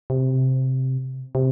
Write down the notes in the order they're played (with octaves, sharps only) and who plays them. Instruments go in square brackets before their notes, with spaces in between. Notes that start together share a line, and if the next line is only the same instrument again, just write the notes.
[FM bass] C3
C3